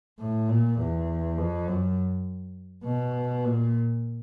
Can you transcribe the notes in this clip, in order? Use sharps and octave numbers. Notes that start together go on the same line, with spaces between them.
A2
A#2
E2
F2
F#2
B2
A#2